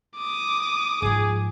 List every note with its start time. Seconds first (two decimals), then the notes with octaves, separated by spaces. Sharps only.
0.17 D6 D#6
1.02 G#2 F3 G#4